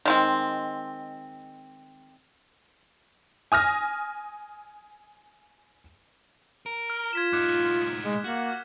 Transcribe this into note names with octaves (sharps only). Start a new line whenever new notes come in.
D#3 G#3 C4
G#5 D#6 F6 A#6
A#4
F6
F4 G#6 B6 E7
A2 D#4 D6 F#6
G#3
A#3 F#4